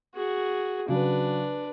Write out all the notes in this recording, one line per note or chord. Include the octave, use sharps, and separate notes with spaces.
F#4 G#4
C#3 F#3 D4 B4